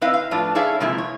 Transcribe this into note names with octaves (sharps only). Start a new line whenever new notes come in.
C4 E4 B4 D#5 F5
F5
A2 F3 D4 F4 B4
E4 G#4 A4 C#5 E5 F5
C3 F3 G#3 A#3 E4
C#5